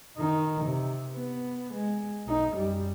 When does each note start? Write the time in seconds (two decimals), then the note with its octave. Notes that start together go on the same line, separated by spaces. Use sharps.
0.17 D#3 D#4
0.65 C3
1.14 B3
1.74 G#3
2.27 B1 D#4
2.55 F#2 G3